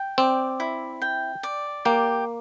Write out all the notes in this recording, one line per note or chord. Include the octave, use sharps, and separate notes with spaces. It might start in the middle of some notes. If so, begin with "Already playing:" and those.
Already playing: G5
C4 D5
E4
G5
D5
A#3 G4